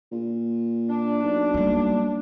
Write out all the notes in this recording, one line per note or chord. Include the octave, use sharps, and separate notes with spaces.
A#2
D4
B1
G3 A#3